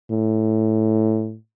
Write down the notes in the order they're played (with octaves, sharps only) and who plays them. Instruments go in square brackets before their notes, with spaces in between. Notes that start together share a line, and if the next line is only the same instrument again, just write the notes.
[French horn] A2